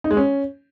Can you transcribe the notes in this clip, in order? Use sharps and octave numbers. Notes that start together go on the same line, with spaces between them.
D#4
G#3
C#4